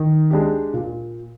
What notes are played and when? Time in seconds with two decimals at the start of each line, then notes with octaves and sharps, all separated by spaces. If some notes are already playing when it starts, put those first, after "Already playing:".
Already playing: D#3
0.30 G#3 D4 G4
0.73 A#2